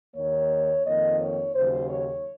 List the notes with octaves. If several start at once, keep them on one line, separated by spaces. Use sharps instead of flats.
D#2 D#3 A#3 C#5
F2 D#3 A#3 D#5
C#5
D#2 C#3 F#3 C5
C#5